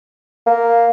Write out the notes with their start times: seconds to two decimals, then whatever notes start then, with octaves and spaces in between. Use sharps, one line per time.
0.46 A#3